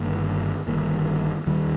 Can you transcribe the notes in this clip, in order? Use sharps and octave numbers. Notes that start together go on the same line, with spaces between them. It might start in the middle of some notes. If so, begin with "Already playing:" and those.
Already playing: G1 G2 D#3 A#3
G1 G2 D#3 A#3
D#2 D#3 G3